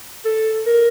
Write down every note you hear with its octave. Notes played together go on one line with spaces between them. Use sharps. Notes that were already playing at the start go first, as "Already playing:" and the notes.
A4
A#4